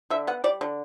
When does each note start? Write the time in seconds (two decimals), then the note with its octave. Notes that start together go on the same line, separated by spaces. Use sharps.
0.10 D3 E5
0.27 B3 F#5
0.44 G3 D5
0.61 D3